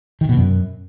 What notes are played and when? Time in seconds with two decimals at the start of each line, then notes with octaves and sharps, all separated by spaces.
0.21 D#3
0.29 B2
0.37 F#2